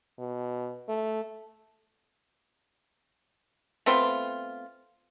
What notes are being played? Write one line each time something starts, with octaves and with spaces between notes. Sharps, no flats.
B2
A3
A3 B3 C4 F4